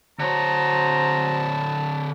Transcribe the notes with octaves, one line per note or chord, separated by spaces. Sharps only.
D3 F#4 C5 C#5 A5 A#5